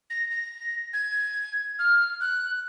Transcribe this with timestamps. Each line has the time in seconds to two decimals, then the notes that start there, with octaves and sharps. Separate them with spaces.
0.10 A#6
0.31 A#6
0.94 G#6
1.79 F6
2.21 F#6